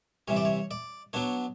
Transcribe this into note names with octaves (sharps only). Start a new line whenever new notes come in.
C3 E3 G3 C#5
D5
C#5
D5
F#3 B3 D4 C#5